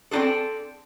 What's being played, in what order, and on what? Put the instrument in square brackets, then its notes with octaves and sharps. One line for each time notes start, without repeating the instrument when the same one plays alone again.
[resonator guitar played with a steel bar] C4 D4 D#4 G#4 A4